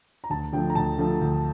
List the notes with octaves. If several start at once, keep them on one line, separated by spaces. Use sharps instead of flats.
A#5
D2 A5
D3 F3 A3 G5
A#5
D2 A5
D3 F3 A3
D2